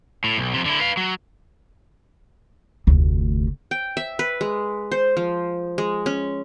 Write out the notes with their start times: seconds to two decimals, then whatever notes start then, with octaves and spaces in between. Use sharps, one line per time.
0.24 A2
0.38 B1
0.53 F2 C3
0.66 D3 E4
0.80 B4 F5
0.97 F#3
2.87 F1 D2
3.71 G5
3.97 E5
4.19 B4
4.41 G#3
4.92 C5
5.17 F3
5.78 G#3
6.06 C#4